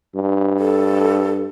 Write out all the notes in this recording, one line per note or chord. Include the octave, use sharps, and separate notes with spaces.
G2
A4